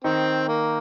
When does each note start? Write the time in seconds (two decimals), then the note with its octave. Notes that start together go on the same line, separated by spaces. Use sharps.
0.04 D#3 C4 D#4
0.49 A#3